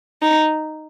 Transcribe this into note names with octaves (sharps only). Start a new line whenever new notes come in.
D#4